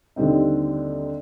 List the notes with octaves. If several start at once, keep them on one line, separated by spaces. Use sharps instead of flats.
D#2 D3 G3 C4 D#4